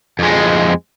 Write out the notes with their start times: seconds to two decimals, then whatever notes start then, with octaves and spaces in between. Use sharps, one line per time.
0.19 F2 G#3